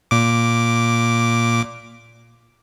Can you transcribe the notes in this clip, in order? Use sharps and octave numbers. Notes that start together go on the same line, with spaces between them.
A#2 D6